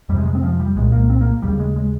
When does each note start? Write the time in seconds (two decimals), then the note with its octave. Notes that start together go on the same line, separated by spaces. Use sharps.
0.09 F2 G3
0.13 C3 G#3
0.25 G#3
0.35 C4
0.43 F3
0.60 G3
0.76 C2 A#2 G#3
0.92 A#3
1.10 C4
1.21 A#3
1.42 D#2 C#3 G3
1.59 G#3
1.76 G#3